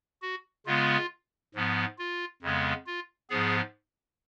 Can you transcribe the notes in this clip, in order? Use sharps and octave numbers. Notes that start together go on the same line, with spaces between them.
F#4
C#3 G#3 B3 F4
G#2 F3 B3
F4
F2 C#3 G#3 B3
F4
G#2 F3 B3 G#4